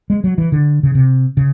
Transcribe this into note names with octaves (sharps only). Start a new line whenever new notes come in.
G#3
F#3
E3
D3
C#3
C3
C#3